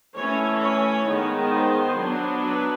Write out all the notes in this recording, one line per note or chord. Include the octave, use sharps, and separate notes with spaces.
E3 A3 C#4 C#5
C#5
D#3 G#3 B3
C5
F#3 B3 D4
B4